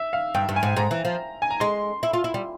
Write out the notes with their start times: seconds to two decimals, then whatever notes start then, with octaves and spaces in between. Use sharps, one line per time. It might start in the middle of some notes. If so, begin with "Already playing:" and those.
Already playing: E5
0.13 F5
0.35 G2 G5
0.49 G2
0.56 G#5
0.63 G#2
0.77 G#2 A#5
0.91 E3
1.05 F3
1.42 G#5
1.50 A#5
1.60 G#3 C6
2.03 E4
2.13 F4
2.24 E4
2.34 G3